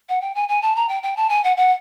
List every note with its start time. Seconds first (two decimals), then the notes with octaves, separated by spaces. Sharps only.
0.09 F#5
0.21 G5
0.35 G#5
0.49 G#5
0.62 A5
0.76 A#5
0.89 G5
1.03 G5
1.17 A5
1.29 G#5
1.44 F#5
1.57 F#5